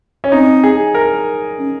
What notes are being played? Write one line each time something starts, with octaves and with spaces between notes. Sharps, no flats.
C#4
C4 D#4
G#4
A#4
C#4